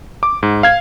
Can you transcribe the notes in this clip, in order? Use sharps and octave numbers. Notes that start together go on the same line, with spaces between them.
D6
G#2
F5 G#6